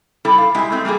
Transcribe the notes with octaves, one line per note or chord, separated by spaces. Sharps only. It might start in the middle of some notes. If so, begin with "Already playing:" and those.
G3 E4 A4
F5
G#3 E4 G4
G#3 A3 C4
G3 A#3 F#4 G#4